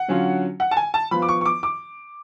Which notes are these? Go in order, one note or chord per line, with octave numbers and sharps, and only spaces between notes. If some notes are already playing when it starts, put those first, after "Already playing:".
Already playing: F#5
D3 F#3 C#4 F4
F#5
A5
G#5
A5
F3 B3 F4 B5
D6
C#6
C#6
D6
D6